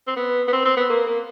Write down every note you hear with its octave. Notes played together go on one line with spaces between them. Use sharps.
C4
B3
B3
C4
C4
B3
A#3
A#3